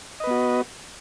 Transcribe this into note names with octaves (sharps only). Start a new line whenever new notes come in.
B3 F#4 B4 D#5